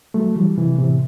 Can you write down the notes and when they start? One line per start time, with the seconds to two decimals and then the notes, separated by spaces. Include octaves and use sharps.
0.14 F#3 A3
0.36 E3 G3
0.58 C3 E3
0.79 A2 C3